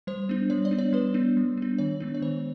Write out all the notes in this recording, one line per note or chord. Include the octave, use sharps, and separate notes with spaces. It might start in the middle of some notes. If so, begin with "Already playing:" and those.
G3 C5
B3 D4
G3 C#5
D5
B3 D4
C#5
G3 B4
B3 D4
G3
B3 D4
D#3 C#5
G#3 B3 D4
C#5
D#3 C5